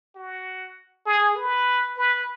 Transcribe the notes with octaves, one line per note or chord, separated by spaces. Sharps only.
F#4
G#4
B4
B4